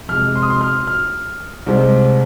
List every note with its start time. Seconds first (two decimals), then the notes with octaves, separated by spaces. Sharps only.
0.09 F2 C3 G#3 F6
0.35 C6
0.42 D#6
0.50 C6
0.61 F6
0.87 F6
1.66 C2 C3 G#3 C4